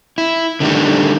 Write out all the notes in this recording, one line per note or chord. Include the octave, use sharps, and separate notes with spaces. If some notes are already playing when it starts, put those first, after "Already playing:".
E4
D3 D#3 G3 A3